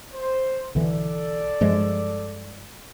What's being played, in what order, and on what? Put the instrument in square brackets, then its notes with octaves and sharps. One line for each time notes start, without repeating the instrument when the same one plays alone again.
[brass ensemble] C5
[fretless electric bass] B1 D3 E3 [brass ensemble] A4 D5
[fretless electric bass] G2 F3 G#3